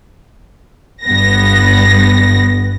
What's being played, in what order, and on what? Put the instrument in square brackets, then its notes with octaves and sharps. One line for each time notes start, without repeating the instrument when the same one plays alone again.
[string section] G1 G2 B3 A#6